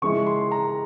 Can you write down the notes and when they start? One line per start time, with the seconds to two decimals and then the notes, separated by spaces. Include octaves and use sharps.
0.02 C#3 F3 G#3 C#4 E4 C#6
0.27 C6
0.51 A#5